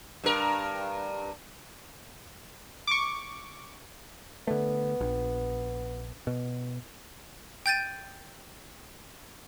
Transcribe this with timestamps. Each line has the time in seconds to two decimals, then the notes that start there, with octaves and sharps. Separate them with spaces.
0.24 G2 A#4
2.87 C#6 D6
4.47 D3 A3 B3
5.01 A#1
6.27 B2
7.66 G5 G6 A6 D#7